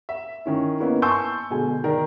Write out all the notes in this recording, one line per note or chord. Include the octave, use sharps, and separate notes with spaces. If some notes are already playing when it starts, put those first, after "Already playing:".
E5
D#3 C#4 E4
A#3 B3 C#4 D#4 E4
G#5 A5 C6 C#6 E6 G6
B2 D3 G#3 G#5
D#3 A#4 D5